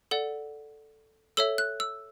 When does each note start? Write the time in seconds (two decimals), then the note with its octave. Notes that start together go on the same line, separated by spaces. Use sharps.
0.11 A4 D5 F#5
1.37 A4 C#5 E5 E6
1.58 F#6
1.80 E6